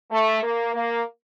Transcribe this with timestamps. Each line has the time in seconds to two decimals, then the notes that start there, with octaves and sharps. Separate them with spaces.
0.11 A3
0.42 A#3
0.74 A#3